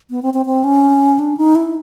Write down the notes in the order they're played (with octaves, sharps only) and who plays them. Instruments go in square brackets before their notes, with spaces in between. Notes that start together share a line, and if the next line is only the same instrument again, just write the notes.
[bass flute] B3
C4
C4
C4
C#4
D4
D#4
E4